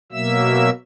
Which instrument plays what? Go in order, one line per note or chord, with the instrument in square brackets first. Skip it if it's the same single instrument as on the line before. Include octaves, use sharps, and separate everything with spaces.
[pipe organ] B2 F#3 A#3 E5 E6